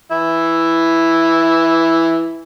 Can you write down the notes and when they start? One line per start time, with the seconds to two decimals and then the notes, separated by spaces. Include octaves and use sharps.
0.12 E3 E4